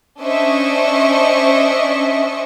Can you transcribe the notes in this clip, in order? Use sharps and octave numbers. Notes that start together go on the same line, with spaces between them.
C#4 D4 C5 D#5 E5 C#6